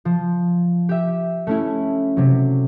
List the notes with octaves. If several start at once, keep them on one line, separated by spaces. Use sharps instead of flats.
F3
G4 E5
A3 C#4 E4
C3 F#3